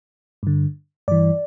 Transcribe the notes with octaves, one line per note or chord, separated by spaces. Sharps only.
G2 D3
G2 E3 D5